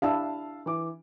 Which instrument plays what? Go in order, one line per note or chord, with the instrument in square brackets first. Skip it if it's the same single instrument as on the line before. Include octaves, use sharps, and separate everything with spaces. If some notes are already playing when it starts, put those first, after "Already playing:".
[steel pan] D4 E4 G4 [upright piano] F5 A5 E6
[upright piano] E3 D6